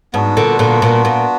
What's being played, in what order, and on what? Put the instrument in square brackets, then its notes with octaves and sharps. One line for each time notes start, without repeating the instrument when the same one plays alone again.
[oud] G#2 [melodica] B3 D4 F#4
[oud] A#2 D3
A#2 D3
A#2
A#2